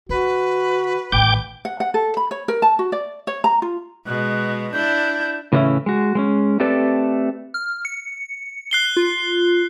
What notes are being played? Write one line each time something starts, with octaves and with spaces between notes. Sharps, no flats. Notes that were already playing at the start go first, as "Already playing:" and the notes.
D3 F#4 B4
A1 D#3 G5 D6 G6
F#5
F#5
A4
B5
C#5
A#4
A5
F#4
D5
C#5
A#5
F4
B2 G#3 F#6
D4 E4 G6
A2 C#3 E3 F#3 C#4 E4
G#3 F#4
G#3 C4 C#4
A3 C4 G4 A4 B4 D5
F6
C#7
F#6 C7 G7
F4